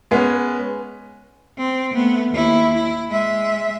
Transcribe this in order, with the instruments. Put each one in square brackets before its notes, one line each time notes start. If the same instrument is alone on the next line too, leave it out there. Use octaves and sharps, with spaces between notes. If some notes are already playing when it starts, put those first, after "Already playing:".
[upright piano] G#3 B3 C#4
[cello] C4
A3 B3
D#2 E4
E4
G#3 E5